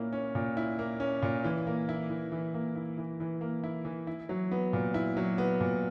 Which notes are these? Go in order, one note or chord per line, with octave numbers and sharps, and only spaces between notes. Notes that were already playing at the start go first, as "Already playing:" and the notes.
Already playing: A#2 A#3 C#4 E4
C#4
A#2
E4
A#3
C#4
A#2
E3
A#3
E4
E3
E3
A#3
E4
E3
E3
A#3
E4
E3
E4
F#3
B3
A#2
E4
F#3
B3
A#2